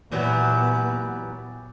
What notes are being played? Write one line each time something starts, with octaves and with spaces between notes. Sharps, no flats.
A#2 E3 F#3 G3 B3